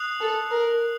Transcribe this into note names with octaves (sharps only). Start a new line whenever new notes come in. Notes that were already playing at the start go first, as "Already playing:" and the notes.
Already playing: D#6 F#6 C7 F7
A4
A#4